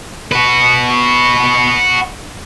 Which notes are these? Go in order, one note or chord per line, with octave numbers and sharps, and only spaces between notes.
F#4 B4